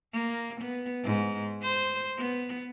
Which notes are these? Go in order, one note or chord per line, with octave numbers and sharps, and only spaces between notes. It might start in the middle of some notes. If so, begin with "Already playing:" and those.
A#3
B3
G#2
C5
B3